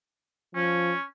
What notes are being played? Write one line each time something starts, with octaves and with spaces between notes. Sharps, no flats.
F3 C#4